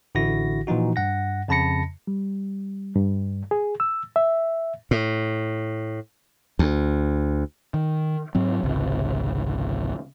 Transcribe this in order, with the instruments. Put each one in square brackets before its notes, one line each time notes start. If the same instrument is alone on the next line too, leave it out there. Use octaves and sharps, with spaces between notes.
[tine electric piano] A1 D3 E4 F#4 A#6
A#2 E3 F3 D#4 F#4
G2 F#5 A#6
F2 C#3 A5 B5 A#6 C#7
[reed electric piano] G3
G2
G#4
E6
E5
[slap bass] A2
D2
[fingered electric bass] D#3
G#2 F#3 C4
G#1 C#2 C3